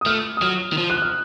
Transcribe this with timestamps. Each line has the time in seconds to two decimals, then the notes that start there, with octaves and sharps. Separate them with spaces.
0.01 D#6
0.06 A3 F6
0.37 D#6
0.42 F#3 F6
0.73 D#3
0.78 F3
0.90 F#6
1.02 F6